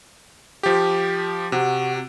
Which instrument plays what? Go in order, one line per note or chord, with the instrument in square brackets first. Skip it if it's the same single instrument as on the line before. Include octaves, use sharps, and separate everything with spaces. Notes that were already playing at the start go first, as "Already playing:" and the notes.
[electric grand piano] F3 G4
[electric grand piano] C3 [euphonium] F#4